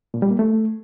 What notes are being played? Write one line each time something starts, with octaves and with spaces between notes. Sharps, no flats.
A#2
G3
A#3
A3